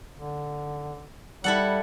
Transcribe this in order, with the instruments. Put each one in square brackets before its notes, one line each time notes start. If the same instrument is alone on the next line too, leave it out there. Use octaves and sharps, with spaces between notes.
[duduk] D3
[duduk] G3 [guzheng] E4 A4 F#5